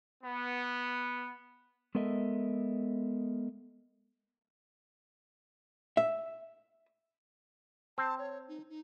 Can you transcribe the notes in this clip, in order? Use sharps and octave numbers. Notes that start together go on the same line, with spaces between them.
B3
G#3 B3 A4 A#4 D#5 E5
E5
C4 A5
C#5
D#4
D#4